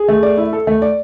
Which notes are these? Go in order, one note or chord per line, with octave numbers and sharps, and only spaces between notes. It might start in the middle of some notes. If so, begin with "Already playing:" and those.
Already playing: G#4
A3
D5
E4
A4
A3
D5